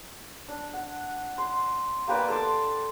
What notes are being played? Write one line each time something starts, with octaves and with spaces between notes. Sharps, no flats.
D4
F#5
C6
A#3 G4 B4 D5
A4 C6 D6